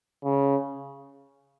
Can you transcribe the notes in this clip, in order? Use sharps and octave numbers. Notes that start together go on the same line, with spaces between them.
C#3